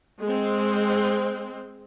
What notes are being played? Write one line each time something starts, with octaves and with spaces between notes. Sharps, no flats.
G#3 C4